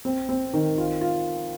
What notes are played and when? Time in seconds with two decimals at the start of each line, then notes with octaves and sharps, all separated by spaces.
0.05 C4
0.29 C4
0.53 D#3
0.78 F4
1.01 F4